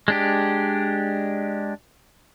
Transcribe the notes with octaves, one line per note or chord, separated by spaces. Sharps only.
G#3 D4 G4